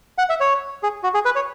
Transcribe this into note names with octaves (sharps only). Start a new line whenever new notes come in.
F#5
E5
C#5
G#4
F#4
G#4
B4
C#5